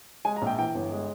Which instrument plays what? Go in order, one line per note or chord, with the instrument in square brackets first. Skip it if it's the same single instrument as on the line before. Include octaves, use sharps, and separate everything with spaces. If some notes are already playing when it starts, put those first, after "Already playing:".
[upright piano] G#3 G#5
A#5
A#1 G5
E3 G5
G1
G#3